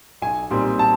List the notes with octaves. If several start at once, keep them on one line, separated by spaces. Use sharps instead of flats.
B1 G#5
A#2 G3 C4 D#4
A5